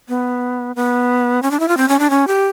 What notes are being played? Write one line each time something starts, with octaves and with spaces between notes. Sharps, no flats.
B3
B3
C#4
D4
E4
F4
C4
C#4
D4
C#4
G4